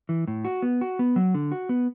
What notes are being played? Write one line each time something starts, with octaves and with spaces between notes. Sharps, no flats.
E3
A2
F#4
B3
F#4
B3
F#3
D3
F#4
B3